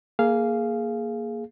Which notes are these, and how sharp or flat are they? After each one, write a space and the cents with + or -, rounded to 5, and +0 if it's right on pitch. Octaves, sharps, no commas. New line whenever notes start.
A#3 +0 G#4 +15 F5 -10